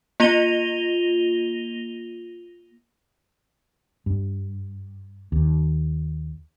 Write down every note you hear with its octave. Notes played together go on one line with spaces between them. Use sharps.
A#3 F4 A#6 D#7 F7 G7
G2
D#2